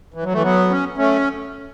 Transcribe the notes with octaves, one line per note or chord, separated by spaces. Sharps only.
E3
F#3
E3 A3
F#3 B3
C#4
A3 C#4